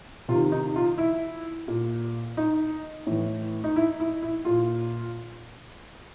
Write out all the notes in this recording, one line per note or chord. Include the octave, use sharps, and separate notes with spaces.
C3 F4
D#3
D#4
F4
E4
A#2
D#4
A2 E3
D#4
E4
E4
E4
A#2 F4